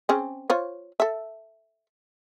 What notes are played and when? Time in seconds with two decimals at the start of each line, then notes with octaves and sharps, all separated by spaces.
0.09 C4 C#4 G#4
0.50 F4 C5 C#5
1.00 A4 E5